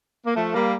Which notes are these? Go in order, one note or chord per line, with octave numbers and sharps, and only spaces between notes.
A#3
F3 A3
G3 A#3